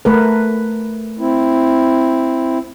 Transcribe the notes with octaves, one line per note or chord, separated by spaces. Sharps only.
A3 A#4 B4
C4 E4